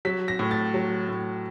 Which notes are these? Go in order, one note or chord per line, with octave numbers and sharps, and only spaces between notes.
F#3 B6
A#6
A2
A6
F#3
A2